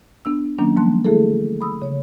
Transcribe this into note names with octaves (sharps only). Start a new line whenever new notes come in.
B3 D4 E6
D#3 F#3 A#3 B3 C#4 D4
F3 G3 A#3 A5 C6 F#6
D3 E3 A3 E4 G#4 A4
B5 D#6 E6
C#3 C#5